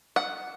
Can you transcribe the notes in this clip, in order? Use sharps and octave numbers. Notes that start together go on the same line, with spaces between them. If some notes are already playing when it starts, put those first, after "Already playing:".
F#5